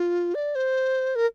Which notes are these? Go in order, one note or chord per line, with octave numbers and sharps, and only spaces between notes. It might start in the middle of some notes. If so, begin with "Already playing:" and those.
Already playing: F4
D5
C5
A#4